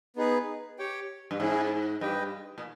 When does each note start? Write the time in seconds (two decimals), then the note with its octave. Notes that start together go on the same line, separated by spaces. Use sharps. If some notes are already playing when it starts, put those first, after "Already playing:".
0.16 B3 D#4 G#4 B4
0.78 G4 C#5 G5
1.31 G2
1.40 G#2 C#4 E4 G#4
2.01 G2 G4 B4 D#5 G5
2.58 A#2